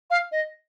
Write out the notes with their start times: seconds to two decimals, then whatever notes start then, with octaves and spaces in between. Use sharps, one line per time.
0.10 F5
0.31 D#5